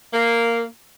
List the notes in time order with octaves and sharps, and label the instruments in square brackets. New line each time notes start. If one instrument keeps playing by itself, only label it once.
[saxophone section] A#3